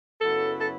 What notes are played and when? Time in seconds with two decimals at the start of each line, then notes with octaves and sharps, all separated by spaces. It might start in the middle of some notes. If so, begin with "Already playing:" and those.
0.21 F#2 C#3 F#3 B3 E4 A4
0.59 A4